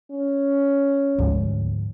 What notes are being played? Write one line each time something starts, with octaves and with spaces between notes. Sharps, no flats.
C#4
D2 G#2 F3 G#3